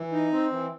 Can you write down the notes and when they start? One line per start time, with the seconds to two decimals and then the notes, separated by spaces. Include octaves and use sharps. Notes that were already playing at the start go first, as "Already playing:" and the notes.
Already playing: E3
0.12 D#4
0.32 C4
0.52 E3